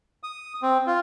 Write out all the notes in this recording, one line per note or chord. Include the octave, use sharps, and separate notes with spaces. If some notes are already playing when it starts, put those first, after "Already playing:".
D#6
C4
F4